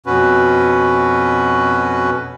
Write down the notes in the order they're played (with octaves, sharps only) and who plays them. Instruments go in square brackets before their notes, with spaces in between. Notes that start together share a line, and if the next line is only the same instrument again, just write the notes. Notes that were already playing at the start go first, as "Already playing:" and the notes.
[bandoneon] F2 B2 C#4 F#4 B4